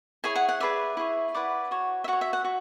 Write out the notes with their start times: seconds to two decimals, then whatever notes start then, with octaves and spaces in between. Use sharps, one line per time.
0.24 E4 G#4 C#5 G#5
0.36 F#5
0.49 F#5
0.60 G#4 B4 D5 E5
0.97 E4 G#4 C#5
1.35 E4 B4 D5 F#5
1.71 F#4 C#5
2.04 E5
2.08 F#4 C#5 F#5
2.21 E5
2.33 F#5
2.44 F#4